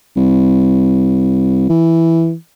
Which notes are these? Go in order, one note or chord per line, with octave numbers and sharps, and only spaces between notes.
C2
E3